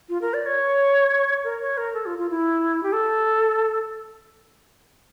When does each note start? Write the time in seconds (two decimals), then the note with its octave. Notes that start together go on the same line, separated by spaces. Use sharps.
0.09 F4
0.22 A#4
0.34 D5
0.46 C#5
1.44 A#4
1.61 C#5
1.77 A#4
1.94 A4
2.06 F4
2.19 F4
2.30 E4
2.83 G4
2.93 A4